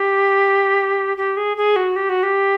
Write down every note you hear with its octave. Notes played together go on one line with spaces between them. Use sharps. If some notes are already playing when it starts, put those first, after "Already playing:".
Already playing: G4
G4
G#4
G#4
F#4
G4
F#4
G4